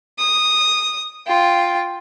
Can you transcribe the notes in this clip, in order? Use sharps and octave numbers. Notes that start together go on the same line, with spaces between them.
D#6
F4 G5